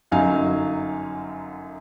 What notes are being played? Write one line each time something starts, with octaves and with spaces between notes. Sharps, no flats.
G1 F#2 F#3 D#4 F5 G#5